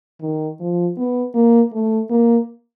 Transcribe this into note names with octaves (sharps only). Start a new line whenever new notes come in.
D#3
F3
B3
A#3
A3
A#3